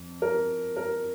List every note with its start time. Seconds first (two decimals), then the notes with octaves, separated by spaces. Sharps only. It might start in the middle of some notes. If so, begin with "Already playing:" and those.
Already playing: F2
0.22 A#4
0.76 A#4